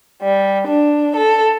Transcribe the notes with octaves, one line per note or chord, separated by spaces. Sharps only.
G3
D4
A4